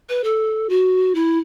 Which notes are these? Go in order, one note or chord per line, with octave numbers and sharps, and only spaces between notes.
B4
A4
F#4
E4